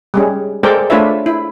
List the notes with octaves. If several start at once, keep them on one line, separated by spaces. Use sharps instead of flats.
G3 G#3 C#4
G#3 A4 A#4 C5 D5 G5
A3 D4 F4 B4 C#5 E5
E4